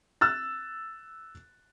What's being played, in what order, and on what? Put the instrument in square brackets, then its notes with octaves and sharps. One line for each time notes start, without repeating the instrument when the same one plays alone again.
[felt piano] E6 F#6 A6